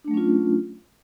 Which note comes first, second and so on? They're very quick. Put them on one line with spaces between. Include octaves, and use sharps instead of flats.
D4 A3 F#3 C#4 F4